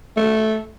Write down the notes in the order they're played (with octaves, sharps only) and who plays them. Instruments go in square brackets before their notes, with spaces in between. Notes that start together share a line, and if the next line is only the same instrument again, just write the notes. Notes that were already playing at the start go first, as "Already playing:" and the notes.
[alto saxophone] A3